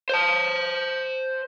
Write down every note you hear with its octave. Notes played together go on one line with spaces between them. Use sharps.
C5 A5